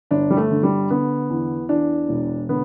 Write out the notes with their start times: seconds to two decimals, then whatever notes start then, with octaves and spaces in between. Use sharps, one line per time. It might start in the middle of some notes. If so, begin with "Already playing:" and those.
0.11 G1 D4
0.30 G3
0.37 A3
0.51 D3
0.63 G3
0.90 D3 B3
1.30 E2
1.69 E2 D4
2.09 E1
2.49 D3 B3